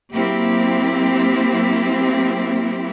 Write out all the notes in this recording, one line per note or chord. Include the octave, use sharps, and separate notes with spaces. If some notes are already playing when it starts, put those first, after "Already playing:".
F#3 A#3 C4 E4 G4